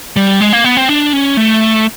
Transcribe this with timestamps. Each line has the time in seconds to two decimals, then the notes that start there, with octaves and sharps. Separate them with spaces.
0.16 G3
0.41 G#3
0.52 A#3
0.64 B3
0.77 C4
0.89 D4
1.13 C#4
1.37 A3